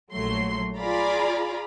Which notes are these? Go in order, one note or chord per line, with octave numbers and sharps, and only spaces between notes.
A#1 F#3 A3 C6
F4 G#4 D5 F5 A#5 B5